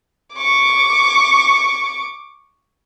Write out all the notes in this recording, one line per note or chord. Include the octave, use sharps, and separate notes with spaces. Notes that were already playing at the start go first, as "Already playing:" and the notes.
C#6 D6